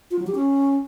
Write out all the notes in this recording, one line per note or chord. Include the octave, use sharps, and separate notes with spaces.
F4
F#3
G4
C#4